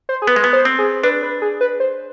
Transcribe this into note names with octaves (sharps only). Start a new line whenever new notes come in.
C5
G#4
B3 B4
G#3
B3
C5
C4
G#4
D4 B4
B4
G#4
B4
C5